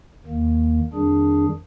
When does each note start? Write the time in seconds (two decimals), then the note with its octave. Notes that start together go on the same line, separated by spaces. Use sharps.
0.26 D#2 D#3 A#3
0.93 F2 D#3 G3 D4 G#4